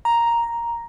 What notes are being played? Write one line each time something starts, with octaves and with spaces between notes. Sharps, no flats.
A#5